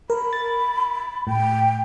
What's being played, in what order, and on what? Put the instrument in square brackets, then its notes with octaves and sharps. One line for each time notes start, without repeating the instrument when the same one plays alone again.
[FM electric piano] A#4 [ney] B5
[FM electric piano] A6
[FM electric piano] A2 [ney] G5